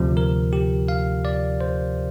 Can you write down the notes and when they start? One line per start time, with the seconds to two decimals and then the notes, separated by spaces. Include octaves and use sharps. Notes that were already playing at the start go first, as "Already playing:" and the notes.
Already playing: D2 C3 F3
0.17 A#4
0.53 G4
0.88 F5
1.25 D5
1.61 C5